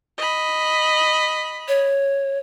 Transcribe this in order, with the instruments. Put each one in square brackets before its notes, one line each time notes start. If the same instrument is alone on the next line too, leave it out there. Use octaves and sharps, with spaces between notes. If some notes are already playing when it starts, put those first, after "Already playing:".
[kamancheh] D#5 B5
[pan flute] C#5